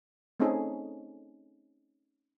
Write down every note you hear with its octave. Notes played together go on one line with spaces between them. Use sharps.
A3 C4 C#4 D#4 G#4 A4